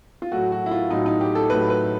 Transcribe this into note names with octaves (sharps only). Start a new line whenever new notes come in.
F4
A2 F#3 A3 F#4
F#4
E4
F4
A2 F#3 A3 D#4
D#4
G4
A4
A2 F#3 A3 B4
B4